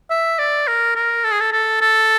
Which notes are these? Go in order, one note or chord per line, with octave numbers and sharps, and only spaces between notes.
E5
D5
A#4
A#4
A4
G#4
A4
A4
A4